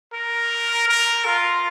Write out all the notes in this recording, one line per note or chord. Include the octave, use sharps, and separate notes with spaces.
A#4
A#4
F4